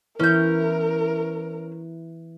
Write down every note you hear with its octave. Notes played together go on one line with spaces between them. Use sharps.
E3 C#4 E4 A#4 B4 G6